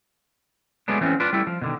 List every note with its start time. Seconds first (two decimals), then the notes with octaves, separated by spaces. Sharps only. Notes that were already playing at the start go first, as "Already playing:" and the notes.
0.88 F#3 G#3 A3 B3 D4
1.01 E3 F#3 A3 C4 C#4
1.20 D4 F4 B4
1.33 G3 A3 E4
1.47 F3
1.61 B2 D3 D#3